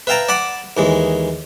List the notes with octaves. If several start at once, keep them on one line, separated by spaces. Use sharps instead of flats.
B4 E5 F5 G5 A5 A#5
D5 F#5 A5 B5 D6
D#2 E3 G#3